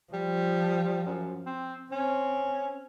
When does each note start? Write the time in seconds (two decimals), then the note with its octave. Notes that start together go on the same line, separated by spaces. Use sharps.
0.13 F3 G3
1.06 F#2
1.46 C4
1.92 C4 C#4